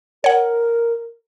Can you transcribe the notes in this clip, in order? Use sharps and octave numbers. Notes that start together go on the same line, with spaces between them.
A#4 C#5 F#5